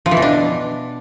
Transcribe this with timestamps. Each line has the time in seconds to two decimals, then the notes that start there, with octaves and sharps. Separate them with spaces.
0.06 F3
0.11 E3
0.17 B2
0.22 D4